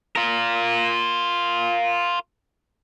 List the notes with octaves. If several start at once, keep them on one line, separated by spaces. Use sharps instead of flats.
F4 A#4